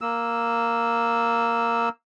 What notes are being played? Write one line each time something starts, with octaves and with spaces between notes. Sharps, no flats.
A#3 E6